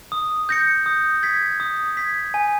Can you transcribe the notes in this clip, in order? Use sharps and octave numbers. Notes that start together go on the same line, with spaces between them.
D#6
G6 A#6 C#7
D#6
G#6 B6
D#6
G#6 B6
G#5